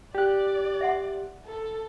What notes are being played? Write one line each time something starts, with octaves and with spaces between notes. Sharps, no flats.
G4 D5 F#6
E5 F#5 C6
A4